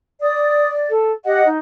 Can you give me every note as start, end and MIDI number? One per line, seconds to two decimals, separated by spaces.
0.22 0.89 74
0.22 0.68 87
0.89 1.11 69
1.25 1.41 67
1.25 1.46 75
1.25 1.46 78
1.45 1.57 63